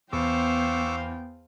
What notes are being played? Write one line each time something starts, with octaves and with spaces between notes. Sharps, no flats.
E2 B3 C5 F5 G5 C#6 D6 E6